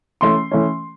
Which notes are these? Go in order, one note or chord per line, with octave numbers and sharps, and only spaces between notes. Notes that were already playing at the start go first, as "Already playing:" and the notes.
E3 A3 C#4 C6
E3 A3 C#4